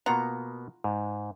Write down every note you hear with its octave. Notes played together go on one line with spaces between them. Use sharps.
B2 A#3 B3 F4 F#5 A#5
G#2